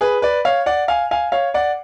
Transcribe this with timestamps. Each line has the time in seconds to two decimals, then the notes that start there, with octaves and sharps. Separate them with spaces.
0.01 G#4 B4
0.22 B4 D5
0.45 C#5 F5
0.66 D5 F#5
0.88 F5 G#5
1.11 F5 G#5
1.32 C#5 F5
1.54 D5 F#5